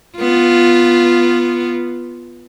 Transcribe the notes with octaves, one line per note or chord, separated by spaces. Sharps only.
B3 F4